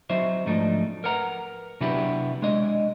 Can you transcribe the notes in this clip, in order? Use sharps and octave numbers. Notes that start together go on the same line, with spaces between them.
F#3 C4 D#4 C5 E5
G#2 F3 A3 D4 D#4
A#4 B4 F#5 A#5
C3 F#3 B3 D4 E4 G4
G#3 D4 D#5